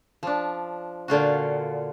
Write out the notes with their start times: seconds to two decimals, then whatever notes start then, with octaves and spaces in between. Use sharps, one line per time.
0.23 F3 D4
1.08 A#2 D3 F4 F#4